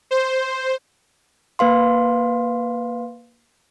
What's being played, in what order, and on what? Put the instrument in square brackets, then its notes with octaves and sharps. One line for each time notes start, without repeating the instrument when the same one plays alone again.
[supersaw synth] C5
[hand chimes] A#3 B4 F5 C6